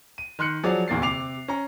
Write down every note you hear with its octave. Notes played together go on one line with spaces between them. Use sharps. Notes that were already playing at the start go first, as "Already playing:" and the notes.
D#7
D#3 C6 F#6 C#7
F3 F#3 G#4 D5
D1 E2 A#3 A6 C7
C3 D6 C7 F7
C#4 A#5